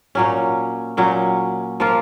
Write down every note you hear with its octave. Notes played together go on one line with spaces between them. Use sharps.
A#2 F#3 C#4
A#2 F#3 C#4
F3 A#3 F4